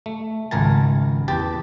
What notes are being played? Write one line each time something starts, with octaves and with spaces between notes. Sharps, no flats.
A3
G#1 C#2 A#4 G#5 A5
E2 G4 G5 A5